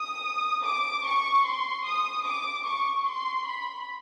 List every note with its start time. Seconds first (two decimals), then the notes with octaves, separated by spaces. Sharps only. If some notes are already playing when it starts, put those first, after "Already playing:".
Already playing: D#6
0.63 D6
1.05 C#6
1.45 C6
1.85 D#6
2.25 D6
2.66 C#6
3.07 C6
3.47 B5